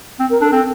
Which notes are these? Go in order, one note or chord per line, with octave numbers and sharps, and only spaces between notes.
C4
A#4
D4 A4
C4 A4